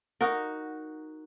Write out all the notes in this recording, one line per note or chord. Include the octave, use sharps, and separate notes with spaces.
D#4 F#4 A#4